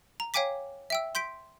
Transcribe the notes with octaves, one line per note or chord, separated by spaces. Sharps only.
A#5
C#5 F5 G5 G#5 D6 B6
E5 G5 E6
C6 G6 B6 D7